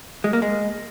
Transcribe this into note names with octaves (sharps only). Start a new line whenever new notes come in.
G#3
A#3
G#3